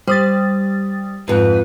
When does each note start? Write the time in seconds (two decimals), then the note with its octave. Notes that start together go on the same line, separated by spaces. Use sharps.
0.07 G3 C5 D#6 A6
1.28 F2 G#2 B4